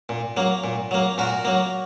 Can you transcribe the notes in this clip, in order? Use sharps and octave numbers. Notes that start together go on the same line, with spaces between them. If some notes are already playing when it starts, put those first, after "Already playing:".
A#2
F#3 A#3
A#2
F#3 A#3
A#2 F#4 A#4
F#3 A#3